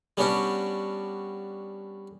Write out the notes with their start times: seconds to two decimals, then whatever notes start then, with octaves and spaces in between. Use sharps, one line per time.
0.17 G3 B3 C#4 D4 F#4 G4